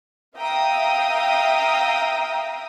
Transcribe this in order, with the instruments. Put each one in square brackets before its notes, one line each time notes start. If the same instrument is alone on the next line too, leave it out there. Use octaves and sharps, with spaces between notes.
[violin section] E5 F5 G5 A#5 D#6